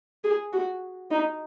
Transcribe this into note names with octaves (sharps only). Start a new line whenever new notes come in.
G#4
F#4
D#4